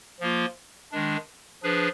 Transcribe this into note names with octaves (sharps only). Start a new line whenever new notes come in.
F3 A#3 F4
D#3 G#3 D4
F3 D4 G#4 B4